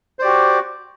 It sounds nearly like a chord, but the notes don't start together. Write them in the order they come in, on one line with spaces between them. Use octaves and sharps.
C5 D5 G4 F#4